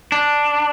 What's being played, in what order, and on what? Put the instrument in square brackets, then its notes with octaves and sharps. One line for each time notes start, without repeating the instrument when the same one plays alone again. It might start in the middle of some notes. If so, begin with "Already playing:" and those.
[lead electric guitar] D4